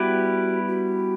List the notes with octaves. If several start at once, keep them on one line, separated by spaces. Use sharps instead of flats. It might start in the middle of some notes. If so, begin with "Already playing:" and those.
Already playing: G3 B3 E4 F#4 G4 B4
F#4